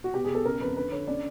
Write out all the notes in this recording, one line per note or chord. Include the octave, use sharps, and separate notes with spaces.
F#4
B2 G4
G#4
B2 A4
C#3 A#4
F2 B4
D3 B4
D3 C#5
C#4 D5